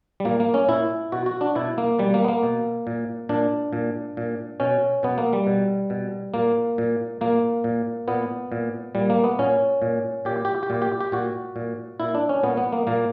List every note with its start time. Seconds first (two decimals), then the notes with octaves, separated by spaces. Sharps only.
0.20 G3
0.25 A#2 A#3
0.40 A#3
0.54 C#4
0.68 A#2 E4
1.12 B2 F#4
1.26 F#4
1.41 D4
1.55 B2 E4
1.78 A#3
1.99 B2 G3
2.14 A#3
2.24 B3
2.28 A#3
2.43 B2
2.87 A#2
3.29 A#2 D4
3.73 A#2
4.17 A#2
4.60 B2 C#4
5.03 B2 B3
5.18 A#3
5.33 G3
5.47 B2
5.90 B2
6.34 A#2 A#3
6.78 A#2
7.21 A#2 A#3
7.64 A#2
8.08 A#2 B3
8.52 A#2
8.95 A#2 G3
9.10 A#3
9.24 B3
9.39 A#2 C#4
9.82 A#2
10.25 A#2 G4
10.45 G4
10.63 G4
10.70 A#2
10.82 G4
11.01 G4
11.12 A#2 F#4
11.56 A#2
12.00 A#2 E4
12.15 D4
12.29 C#4
12.43 A#2 B3
12.57 B3
12.73 A#3
12.87 A#2 A#3